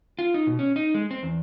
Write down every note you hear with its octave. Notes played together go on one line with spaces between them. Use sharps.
F4
D#4
B2
C#4
D#4
G#3
C4
E2